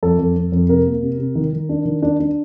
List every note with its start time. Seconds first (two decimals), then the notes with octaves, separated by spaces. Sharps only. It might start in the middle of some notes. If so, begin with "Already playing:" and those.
0.03 F2 A4
0.19 F2
0.36 F2
0.52 F2
0.69 C3 A#4
0.87 A#3
1.03 C3
1.19 C3
1.35 D#3
1.53 D#3
1.69 D4
1.85 D#3
2.02 D4
2.20 D4